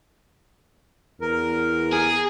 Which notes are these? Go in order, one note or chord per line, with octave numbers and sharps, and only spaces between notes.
E2 A#4
G#4